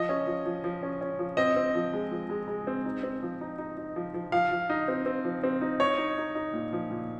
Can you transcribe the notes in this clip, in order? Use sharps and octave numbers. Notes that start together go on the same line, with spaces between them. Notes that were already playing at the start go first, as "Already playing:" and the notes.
Already playing: F3 D#5
C#4
F3
F3
F3
C#4
C#4
F3
C4 D#5
C4
F3
G#3
F3
G#3
G#3
C4
D#4
C4
F3
D#4
D#4
D#4
F3
F3
F3 F5
F3
D#4
C4
C4
F3
C4
D#4
D#4 C#5
D#4
D#4
D#4
A#2
F3
A#2